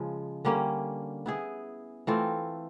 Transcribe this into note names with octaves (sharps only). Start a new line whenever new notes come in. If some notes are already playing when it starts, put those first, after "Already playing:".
Already playing: C#3 F3 G#3
D3 G3 A#3 C#4
B3 E4 G#4
E3 A3 C4 F4